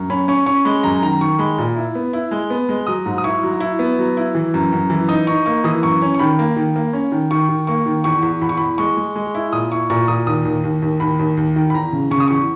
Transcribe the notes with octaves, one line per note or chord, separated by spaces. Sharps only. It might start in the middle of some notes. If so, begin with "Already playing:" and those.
Already playing: F#2
C#4 B5
C#4 C#6
C#4 C#6
G#3 B5
F#2 A#5
D#3 A#5
D#3 C#6
G#3 B5
A#2
E4
B3
E4
G#3
B3
G#3
F#3 D#6
G#2
D#6
E4 C#6
F#3
E4
B3
F#3
E4
E3
F#2
F#2
E3
D#4 D#6
D#4 C#6
A#3 C#6
E3 D#6
F#2 C#6
C#4
C#6
D#3 B5
A#3
D#3
A#3
C#4
D#3
D#3 C#6
D#3
A#3 C#6
D#3
E2 C#6
E2
E2 B5
C#6
E2 B5
G#3 C#6
G#3
G#3
E4
A#2 D#6
E4 C#6
A#2 C#6
A#2 D#6
D#2 D#6
D#2
D#2
D#2
D#2 B5
D#2
D#2
D#3
B5
E2 A#5
C#3
C#3 C#6
D#6
E2 C#6